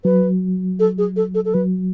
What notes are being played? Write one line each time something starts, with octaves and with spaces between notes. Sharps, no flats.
F#3 B4
A4
G#4
A4
A4
A4
F#3 B4